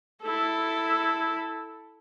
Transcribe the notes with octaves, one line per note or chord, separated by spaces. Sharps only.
E4 A4